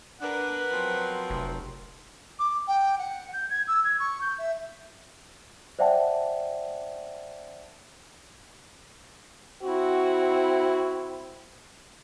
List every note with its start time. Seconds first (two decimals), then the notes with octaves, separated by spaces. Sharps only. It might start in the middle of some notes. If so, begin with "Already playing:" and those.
0.21 D4 A#4 B4 F#5
0.72 F3 F#3 C4
1.30 F1
2.39 D6
2.67 G5
2.98 F#5
3.33 G6
3.49 G#6
3.67 E6
3.84 G#6
3.99 C#6
4.21 G6
4.38 E5
5.79 C5 D5 E5 F#5 G5 A5
9.63 C4 E4 F#4